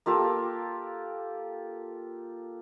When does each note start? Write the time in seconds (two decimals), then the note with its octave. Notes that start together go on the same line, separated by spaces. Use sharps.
0.06 A#3 F4 G4 A4